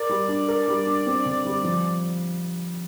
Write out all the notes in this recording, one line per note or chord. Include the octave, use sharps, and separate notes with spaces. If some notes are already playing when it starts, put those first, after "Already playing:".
Already playing: A#4 D5
G3
D4
A#4
G3
D4
C4
D3
G3
F3